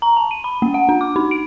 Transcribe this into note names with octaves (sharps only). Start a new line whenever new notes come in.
A#5
A5
D#7
B5
A#3
F#5
D4
D6
D#4
D7